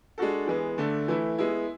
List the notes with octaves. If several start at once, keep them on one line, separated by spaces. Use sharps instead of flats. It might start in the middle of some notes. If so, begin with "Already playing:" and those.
G#3 D4 F#4 A4
E3 G#3 B3
D3 A3 D4
E3 A3 E4
G#3 B3 E4